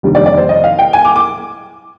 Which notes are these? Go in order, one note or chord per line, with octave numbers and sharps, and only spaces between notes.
F1 D#2 D3 G3
D5
D5
C5
D#5
F5
G5
G#5
D6
D6